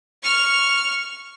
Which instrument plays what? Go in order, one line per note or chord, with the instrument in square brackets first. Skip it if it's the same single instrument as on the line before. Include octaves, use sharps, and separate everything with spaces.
[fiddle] C#6 F6